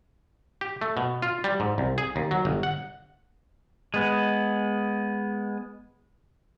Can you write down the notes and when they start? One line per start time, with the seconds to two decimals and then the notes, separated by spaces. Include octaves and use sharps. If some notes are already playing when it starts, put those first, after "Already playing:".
0.61 G4
0.81 A3
0.97 B2
1.22 F4
1.44 G3
1.60 G#2
1.78 C2
1.98 G#4
2.16 D#2
2.31 F#3
2.45 G1
2.63 F#5
3.94 G#3 B3